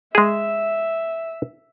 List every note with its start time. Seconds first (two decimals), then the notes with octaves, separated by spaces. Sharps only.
0.15 G#3 G#4 E5